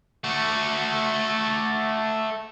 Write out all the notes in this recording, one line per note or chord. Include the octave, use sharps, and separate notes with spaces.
A3 F#4